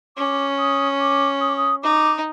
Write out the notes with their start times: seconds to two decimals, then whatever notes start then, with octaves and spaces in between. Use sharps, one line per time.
0.17 C#4 D6
0.59 D#6
1.00 D6
1.41 D#6
1.49 D6
1.57 D#6
1.83 D#4 D6